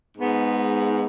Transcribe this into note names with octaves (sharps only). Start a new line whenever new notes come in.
G#2 G#3 B3